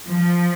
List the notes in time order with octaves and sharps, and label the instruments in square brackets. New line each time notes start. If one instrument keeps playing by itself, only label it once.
[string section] F3